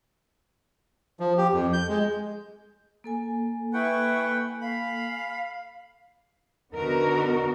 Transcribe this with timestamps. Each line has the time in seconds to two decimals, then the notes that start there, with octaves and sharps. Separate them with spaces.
1.20 F3
1.38 G4
1.53 F2
1.73 G6
1.89 G#3
3.04 A#3 A4 G#5
3.73 E4 B4 F#5 G5 C#6
4.61 F5 B5
6.74 D3 B3 D#4 F#4 A#4